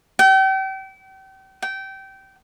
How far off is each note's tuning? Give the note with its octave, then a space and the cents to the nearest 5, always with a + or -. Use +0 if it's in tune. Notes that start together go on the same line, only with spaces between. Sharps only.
G5 -35
G5 -20